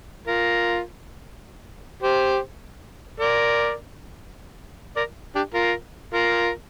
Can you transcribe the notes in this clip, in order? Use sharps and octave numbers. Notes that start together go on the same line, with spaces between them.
F4 A#4
G4 C5
A#4 D5
A#4 D5
D4 G4
F4 A#4
F4 A#4